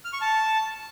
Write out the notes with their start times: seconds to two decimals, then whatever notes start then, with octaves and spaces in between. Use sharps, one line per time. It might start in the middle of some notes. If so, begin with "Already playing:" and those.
0.05 F6
0.13 C#6
0.21 A5